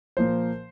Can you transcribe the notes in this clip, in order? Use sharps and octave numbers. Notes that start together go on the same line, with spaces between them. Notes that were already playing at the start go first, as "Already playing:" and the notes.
A#2 F3 A#3 C5